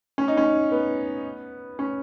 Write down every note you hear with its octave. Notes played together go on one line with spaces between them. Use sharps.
C#4
D#4
C#4
B3
C#4